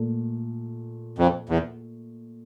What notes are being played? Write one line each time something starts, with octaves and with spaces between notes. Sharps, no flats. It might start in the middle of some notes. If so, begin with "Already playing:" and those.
Already playing: A#2 A3
F2
E2